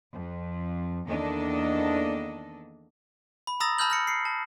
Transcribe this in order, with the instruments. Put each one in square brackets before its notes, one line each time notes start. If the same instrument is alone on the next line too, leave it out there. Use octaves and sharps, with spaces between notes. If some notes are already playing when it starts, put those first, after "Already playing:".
[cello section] F2
E2 D#3 A#3 D4 A4 D#5
[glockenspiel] B5
A#5 B5 D#6 E6 A6 A#6
A5 B5 E6 F6 G6 F#7
F6 A#6 C#7
C7 C#7
A5